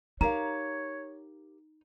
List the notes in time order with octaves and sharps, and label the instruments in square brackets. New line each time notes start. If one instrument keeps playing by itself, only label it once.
[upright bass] D#4 [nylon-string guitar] G4 A#4 F5 [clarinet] C#5 [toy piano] A#5